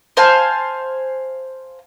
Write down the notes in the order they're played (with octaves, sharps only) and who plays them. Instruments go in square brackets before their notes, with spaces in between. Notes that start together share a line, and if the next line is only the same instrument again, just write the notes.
[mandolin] C5 F5 G#5 A5